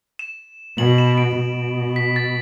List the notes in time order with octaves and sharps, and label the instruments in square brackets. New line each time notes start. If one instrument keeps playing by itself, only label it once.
[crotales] E7
[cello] B2 [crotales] F#7
[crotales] E7
D7
[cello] B2
[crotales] B6
A6